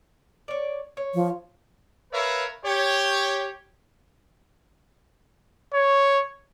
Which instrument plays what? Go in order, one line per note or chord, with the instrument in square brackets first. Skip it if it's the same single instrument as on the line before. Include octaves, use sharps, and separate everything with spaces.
[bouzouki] C#5 D5
C#5
[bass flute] F3
[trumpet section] A#4 B4 C#5 E5 F5
G4 C#5
[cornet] C#5